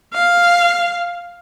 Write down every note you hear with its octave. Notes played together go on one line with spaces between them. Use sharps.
F5